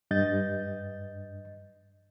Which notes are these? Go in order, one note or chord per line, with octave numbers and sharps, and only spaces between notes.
G2 D#5 G6 A6